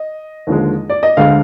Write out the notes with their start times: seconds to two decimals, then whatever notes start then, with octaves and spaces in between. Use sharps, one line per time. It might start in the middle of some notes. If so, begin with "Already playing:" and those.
Already playing: D#5
0.47 D#2 D3 F3 G#3
0.90 D5
1.03 D#5
1.17 D2 D3 G#3 F5